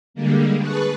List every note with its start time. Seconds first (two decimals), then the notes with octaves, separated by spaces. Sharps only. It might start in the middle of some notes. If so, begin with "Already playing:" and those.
0.14 D3 G3 G#3 A#3
0.60 G#4 B4 A5 C#6 F#6